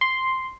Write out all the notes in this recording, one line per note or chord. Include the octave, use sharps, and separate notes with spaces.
C6